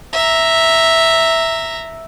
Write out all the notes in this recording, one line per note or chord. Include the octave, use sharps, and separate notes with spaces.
E5 A#5